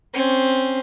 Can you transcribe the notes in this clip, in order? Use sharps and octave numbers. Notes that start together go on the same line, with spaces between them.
C4 C#4